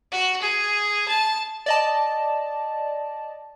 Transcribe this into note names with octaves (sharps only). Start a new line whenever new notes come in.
F#4
G#4
A5
D5 D#5 A5